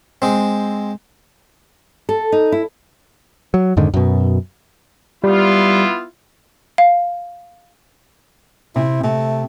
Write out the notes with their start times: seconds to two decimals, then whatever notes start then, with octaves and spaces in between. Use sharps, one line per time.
0.22 G#3 C4
2.09 A4
2.32 D#4
2.52 E4
3.54 F#3
3.77 F2 G#2 D3 D#3
3.94 F#2 B2
5.24 G3 B3 E4 F4
6.78 F5
8.76 C3 E4
9.03 C3 A3